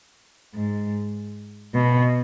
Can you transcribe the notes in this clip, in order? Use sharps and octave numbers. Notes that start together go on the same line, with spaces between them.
G#2
B2